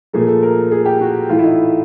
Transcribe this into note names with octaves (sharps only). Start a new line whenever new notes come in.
A#2 F3 A3 G#4
A4
A#4
G#4
G4
F#4
A2 E3 A3 F4
E4
D#4